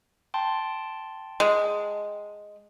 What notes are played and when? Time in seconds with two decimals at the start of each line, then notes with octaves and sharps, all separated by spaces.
0.34 G5 A5 C6
1.40 G#3